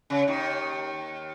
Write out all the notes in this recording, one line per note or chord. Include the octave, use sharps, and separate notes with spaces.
C#3
D#2 D#3